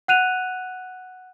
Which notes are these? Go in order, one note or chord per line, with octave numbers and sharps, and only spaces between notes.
F#5 F#6 D#7 F7